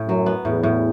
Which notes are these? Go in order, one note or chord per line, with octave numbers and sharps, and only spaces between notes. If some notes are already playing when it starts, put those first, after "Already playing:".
Already playing: A2
F#2 F#3
B3
E2 A2
A2